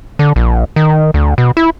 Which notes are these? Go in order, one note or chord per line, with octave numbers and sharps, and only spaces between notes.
D3
A#1
D#3
D2
B2
E4